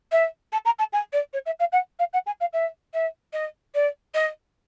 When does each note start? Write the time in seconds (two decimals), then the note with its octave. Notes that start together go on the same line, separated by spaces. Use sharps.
0.12 E5
0.52 A5
0.65 A#5
0.79 A5
0.93 G#5
1.13 D5
1.33 C#5
1.46 E5
1.60 F5
1.72 F#5
1.99 F5
2.13 F#5
2.26 G#5
2.40 F5
2.53 E5
2.94 E5
3.33 D#5
3.74 D5
4.14 D#5